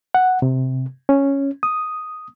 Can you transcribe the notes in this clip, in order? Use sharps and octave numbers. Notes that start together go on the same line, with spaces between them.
F#5
C3
C#4
D#6